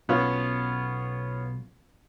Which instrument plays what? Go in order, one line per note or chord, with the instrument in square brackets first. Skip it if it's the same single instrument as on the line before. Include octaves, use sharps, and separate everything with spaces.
[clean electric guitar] B1 [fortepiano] B3 C#4 F4